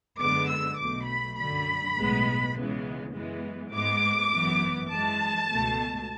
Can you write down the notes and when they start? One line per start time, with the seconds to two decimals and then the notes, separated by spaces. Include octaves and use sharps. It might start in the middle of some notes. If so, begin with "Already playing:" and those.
0.19 F#2 D3 G#3 B3 D6
0.49 E6
0.78 B1 B2 F#3 A3 D6
1.08 B5
1.37 F#2 D3 F#3 B5
1.96 B1 A2 G#3 B3
2.55 C#2 C#3 E3 G#3 B3
3.14 F#2 E3 G#3 B3
3.72 G#2 G#3 B3 D6
4.32 G#1 F#2 E3 B3
4.90 F#2 E3 G#3 A5
5.50 C#2 B2 A3